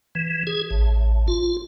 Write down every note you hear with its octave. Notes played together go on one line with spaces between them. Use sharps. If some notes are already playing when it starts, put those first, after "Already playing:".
E3
G#4
A1
F4